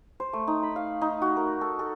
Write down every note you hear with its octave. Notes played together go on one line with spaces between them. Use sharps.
C5
A3
D#4
B5
F5
D#4
F#4
A#4
A4
A4